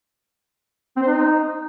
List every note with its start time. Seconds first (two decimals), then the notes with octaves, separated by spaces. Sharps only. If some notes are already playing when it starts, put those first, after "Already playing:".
0.97 C4
1.02 C5
1.08 D#4